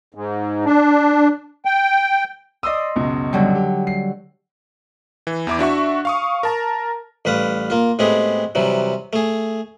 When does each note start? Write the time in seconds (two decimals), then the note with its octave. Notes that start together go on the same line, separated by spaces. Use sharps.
0.15 G#2
0.65 D4
1.65 G5
2.63 D5 D#5 C6 D#6 E6
2.96 C#2 F#2 B2
3.33 D3 F#3 G3
3.55 G4
3.87 C7
5.27 E3
5.47 E2 E4 D6
5.59 D4 F#4 E5 C#6
6.05 F5 C#6 D#6
6.43 A#4 A5 A#5
7.25 A1 G3 B4 F5 D#6
7.70 A#3 F4
7.99 A2 G#3 B3 C4 G4 G#4
8.55 C3 E3 F#3 G3
9.13 A3 G#4